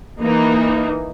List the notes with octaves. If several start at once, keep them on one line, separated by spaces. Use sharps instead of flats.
E3 A#3 D#4